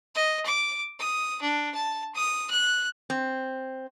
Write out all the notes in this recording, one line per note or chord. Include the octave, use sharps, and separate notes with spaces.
D#5
D6
D#6
D4
A5
D#6
F#6
C4